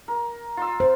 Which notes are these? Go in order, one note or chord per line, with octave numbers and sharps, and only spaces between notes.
A#4
F4 C6 E6
C5